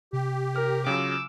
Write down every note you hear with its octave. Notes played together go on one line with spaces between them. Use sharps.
C3 G4
A#4 F6
C#3 F#3 F4 D6 E6